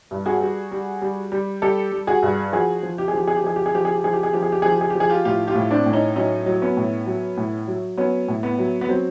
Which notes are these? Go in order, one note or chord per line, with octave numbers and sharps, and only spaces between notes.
G2
F#4 G#4
G3
G3
G3
G3
G3 G4 A4
G3
F#4 G#4
G2
F3 F#4 G#4
F3
G4
G#4
F3 G4
G#4
G4
F3 G#4
G4
G#4
F3 G4
G#4
G4
F3 G#4
G4
G#4
F3 G4
G#4
G4
F3 G#4
G4
G#4
G4
F3
G#4
F4 G4
A2 F4 G4
F4 G4
A2
C4 D4
A2
C#4 D#4
F#3 C#4 D#4
F#3
B3 C#4
A2
F#3
A2
F#3
F#3 B3 C#4
A2
B3
F#3
B3
F#3 C4